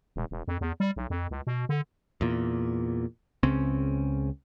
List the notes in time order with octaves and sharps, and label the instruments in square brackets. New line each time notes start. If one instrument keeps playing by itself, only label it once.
[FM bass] E1
E1
F2
E2
G3
B1
F2
C#2
B2
D3
[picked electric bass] E2 A#2
C#2 C#3 C4 C#4